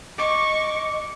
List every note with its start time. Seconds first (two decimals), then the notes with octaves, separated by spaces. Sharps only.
0.18 D#5 C#6 D6